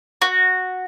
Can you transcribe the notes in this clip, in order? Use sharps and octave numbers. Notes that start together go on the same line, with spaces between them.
F#4